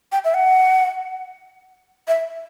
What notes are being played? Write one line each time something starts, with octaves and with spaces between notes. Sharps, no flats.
G5
E5
F#5
E5